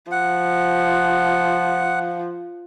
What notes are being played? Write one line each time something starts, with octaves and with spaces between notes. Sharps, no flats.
F3 F#5